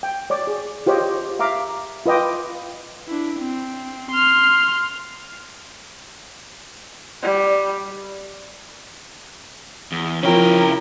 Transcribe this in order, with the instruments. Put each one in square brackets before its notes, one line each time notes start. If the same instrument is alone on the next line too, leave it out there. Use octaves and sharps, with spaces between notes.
[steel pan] G5
C#5 D5 D6
G#4
F4 G4 C5 C#5 D#5 D6
E5 F5 A#5 D6
F4 B4 D#5 G5 D6
[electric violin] D4 E4
C4
C6 F6
[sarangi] G3
[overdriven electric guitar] E2
[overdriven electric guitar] C#3 G5 [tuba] F3 [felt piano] C4 F4 C#5 [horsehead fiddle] E4 A#4